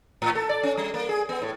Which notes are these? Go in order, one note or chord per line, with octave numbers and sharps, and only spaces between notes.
A2
A4
D5
C#4
G3
A#3
G#4
B3
A2